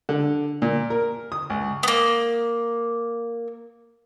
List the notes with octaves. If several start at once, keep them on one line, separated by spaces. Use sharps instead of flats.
D3
A#2
A#4
D#6
C#2
A#3 B3